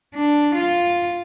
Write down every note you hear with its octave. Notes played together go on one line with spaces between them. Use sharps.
D4
F4